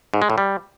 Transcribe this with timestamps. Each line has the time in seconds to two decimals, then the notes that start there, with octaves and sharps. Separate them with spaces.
0.14 G#2
0.22 G#3
0.30 A2
0.38 G3